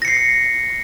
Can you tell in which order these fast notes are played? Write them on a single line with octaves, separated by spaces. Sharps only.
A#6 C#7 C7